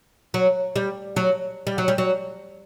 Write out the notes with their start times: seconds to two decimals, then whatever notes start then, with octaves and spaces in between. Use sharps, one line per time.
0.34 F#3
0.76 G3
1.16 F#3
1.67 G3
1.78 F#3
1.88 G3
1.98 F#3